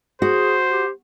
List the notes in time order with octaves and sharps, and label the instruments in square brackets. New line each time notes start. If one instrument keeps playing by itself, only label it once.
[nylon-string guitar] F#4 [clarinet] G#4 [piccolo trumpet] C5
[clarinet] G4